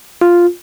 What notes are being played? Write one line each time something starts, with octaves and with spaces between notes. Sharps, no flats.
F4